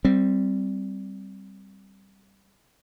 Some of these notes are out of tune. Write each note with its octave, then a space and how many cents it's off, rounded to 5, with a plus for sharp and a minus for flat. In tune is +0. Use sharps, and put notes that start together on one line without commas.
G3 -5 C4 +0